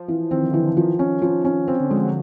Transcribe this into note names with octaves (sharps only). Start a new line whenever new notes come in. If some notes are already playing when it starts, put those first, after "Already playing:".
Already playing: F3
E3
D#3 C4
D3
E3
D3
D#3 F3
C#4
F3
C#4
C#3 C4
D3
F3 G#3
F#3